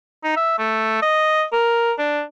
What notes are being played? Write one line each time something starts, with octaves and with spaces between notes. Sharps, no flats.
D#4
E5
A3
D#5
A#4
D4